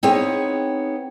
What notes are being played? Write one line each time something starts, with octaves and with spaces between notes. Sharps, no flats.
B3 C4 D#4 G#4 C#5